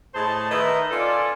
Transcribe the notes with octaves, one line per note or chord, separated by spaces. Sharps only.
A2 G#4 C5 D#5 A5
D#3 B4 D#5 E5 A#5
C#4 F4 A4 D5